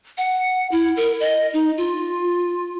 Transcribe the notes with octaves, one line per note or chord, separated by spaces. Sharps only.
F#5
E4
A#4
D#5
D#4
F4